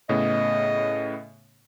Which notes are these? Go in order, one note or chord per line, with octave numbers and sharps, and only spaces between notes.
A2 C#3 B3 D#5